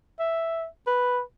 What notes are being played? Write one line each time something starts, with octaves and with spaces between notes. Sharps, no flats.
E5
B4